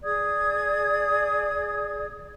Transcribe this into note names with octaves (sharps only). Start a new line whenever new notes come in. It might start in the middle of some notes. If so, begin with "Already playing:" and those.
G#4 D5 D#6 G#6